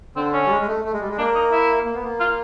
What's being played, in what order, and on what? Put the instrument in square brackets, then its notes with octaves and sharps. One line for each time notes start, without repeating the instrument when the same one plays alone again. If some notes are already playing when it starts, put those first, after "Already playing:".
[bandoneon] D3 [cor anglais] C4
[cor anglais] C#4
[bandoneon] G3
G#3
G#3
A3
A3
G#3
G3
G#3
[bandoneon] A#3 [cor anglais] D4
[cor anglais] D#4
E4
[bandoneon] A#3
B3
A#3
[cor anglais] F4